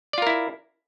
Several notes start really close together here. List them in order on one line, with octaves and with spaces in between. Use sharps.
D5 F4 A#4 E4